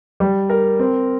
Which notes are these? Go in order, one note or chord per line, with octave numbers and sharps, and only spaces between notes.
G3
A#4
C4